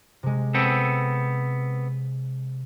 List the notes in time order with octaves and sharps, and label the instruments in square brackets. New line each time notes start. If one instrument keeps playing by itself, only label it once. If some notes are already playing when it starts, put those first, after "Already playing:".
[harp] C3 G#3
[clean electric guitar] B3 C4 A4